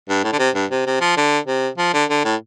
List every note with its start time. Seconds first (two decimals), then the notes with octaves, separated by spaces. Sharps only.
0.09 G2
0.24 A2
0.32 D3
0.39 C3
0.55 G2
0.71 C3
0.86 C3
1.01 F3
1.17 D3
1.47 C3
1.78 F3
1.94 D3
2.10 D3
2.24 A2